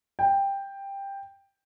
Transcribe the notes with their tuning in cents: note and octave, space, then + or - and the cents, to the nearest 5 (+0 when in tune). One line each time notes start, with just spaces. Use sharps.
G5 +10